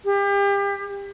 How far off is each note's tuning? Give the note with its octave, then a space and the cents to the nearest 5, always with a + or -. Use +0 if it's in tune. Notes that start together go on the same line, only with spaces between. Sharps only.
G4 +35